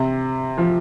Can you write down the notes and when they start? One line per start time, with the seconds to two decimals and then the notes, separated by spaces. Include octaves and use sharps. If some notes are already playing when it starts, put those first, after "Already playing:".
Already playing: C3
0.58 F3